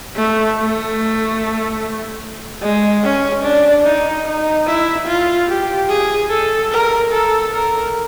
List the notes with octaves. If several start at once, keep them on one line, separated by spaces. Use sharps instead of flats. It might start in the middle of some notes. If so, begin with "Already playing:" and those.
A3
A3
G#3
C#4
D4
D#4
D#4
E4
F4
G4
G#4
A4
A#4
A4
A#4